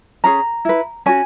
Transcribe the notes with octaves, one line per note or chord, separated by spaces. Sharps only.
C#4 G#4 A#5
E4 B4
C#4 F#4 G#5